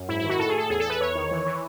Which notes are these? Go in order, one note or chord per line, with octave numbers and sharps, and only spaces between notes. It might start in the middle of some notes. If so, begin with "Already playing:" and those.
Already playing: F#2
G#2 E4
E4
D#3
F#4
A2 A4
G#4
A2 A4
E2 G#4
A4
E2 B4
E2 C#5
D#3
E3
E3